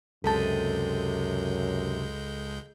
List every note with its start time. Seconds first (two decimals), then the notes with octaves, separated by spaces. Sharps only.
0.24 C#2 F#2 C3 G#3 A4 A5 G6